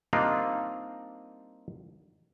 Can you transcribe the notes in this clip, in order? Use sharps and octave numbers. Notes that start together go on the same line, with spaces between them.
G3 A#3 C4 D4 D#4 F4